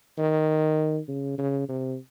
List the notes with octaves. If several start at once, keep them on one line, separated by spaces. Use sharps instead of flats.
D#3
C#3
C#3
C3